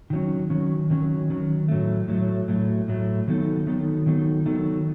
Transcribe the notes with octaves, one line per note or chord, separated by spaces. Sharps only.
D#3 F#3 C#4
D#3 F#3 C#4
D#3 F#3 C#4
D#3 F#3 C#4
A2 F#3 A3
A2 F#3 A3
A2 F#3 A3
A2 F#3 A3
D#3 F#3 B3 D#4 A4
D#3 F#3 B3 D#4 A4
D#3 F#3 B3 D#4 A4
D#3 F#3 B3 D#4 A4